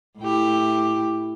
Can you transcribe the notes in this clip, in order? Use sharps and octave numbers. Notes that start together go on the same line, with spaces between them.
A2 E4 G4